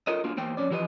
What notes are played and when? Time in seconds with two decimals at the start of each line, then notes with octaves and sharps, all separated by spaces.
0.07 F4 A4 A#4 D#5
0.24 A#3 D4 F4 F#4
0.37 E2 A#3 C5 G5
0.57 F2 B2 C#4 D5
0.70 E3 F3 G4 B4 D#5